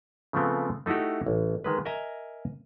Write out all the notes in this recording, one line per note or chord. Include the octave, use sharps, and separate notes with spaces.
C#3 F3 A3 B3 C4
A3 D#4 E4 F#4 G4
A1
D#3 G#3 B4
A#4 D#5 E5 G#5 A#5